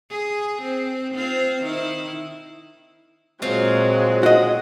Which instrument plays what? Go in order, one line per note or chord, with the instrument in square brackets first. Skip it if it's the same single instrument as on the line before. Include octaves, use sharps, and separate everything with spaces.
[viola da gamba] G#4
C4
C4 F4 C5
D#3 E4
[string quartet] A#2 F#3 G#3 [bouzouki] C4 F4
[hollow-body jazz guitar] F#4 D#5